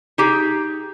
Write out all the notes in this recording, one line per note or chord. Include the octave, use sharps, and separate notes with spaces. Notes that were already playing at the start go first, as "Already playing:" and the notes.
D#4 G4 G#4